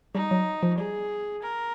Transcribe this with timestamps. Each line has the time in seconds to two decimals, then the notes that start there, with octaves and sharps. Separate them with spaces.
0.14 G3 D#4
0.31 F#3
0.63 F3
0.78 G3 G#4
1.42 A#4